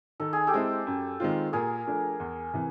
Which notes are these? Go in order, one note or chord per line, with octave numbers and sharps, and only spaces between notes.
D#3 A4
G#4
G4 A4
G#3 C4 E4
F#2
D#3 G#3 C4 F4
A#2 G#4 A#4
F3 A3 D4
E2
C3 E3